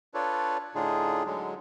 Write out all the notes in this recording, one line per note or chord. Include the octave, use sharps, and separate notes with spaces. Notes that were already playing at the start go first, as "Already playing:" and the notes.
D4 F4 A4 B4 C#5 D5
A2 D3 D4 D#4 F4 G#4
D3 F#3 G#3